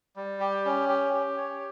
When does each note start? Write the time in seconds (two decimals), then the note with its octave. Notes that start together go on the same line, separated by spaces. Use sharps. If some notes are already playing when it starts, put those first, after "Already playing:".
0.16 G3
0.40 G4
0.65 C#4
0.89 G4
1.13 G4
1.37 C#5